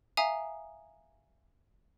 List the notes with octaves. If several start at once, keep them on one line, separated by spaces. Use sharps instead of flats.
E5 F5 G#5 A#5 D#6